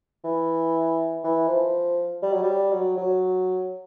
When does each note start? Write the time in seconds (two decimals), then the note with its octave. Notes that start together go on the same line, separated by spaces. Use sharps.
0.24 E3
1.24 E3
1.48 F3
2.22 G3
2.33 F#3
2.43 G3
2.73 F#3
2.98 F#3